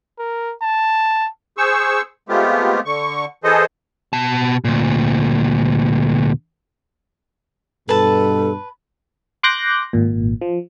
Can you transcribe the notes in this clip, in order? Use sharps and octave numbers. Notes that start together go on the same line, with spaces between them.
A#4
A5
G#4 C5 C#6 E6
G#3 A3 B3 C4 F4 G4
D3 C#6
E3 G#4 A4 C5 D#5
B2 A5
D2 A#2
G2 B2 A4 B4 A5
C6 D6 F#6 G6 A#6
G#1 A#2
F3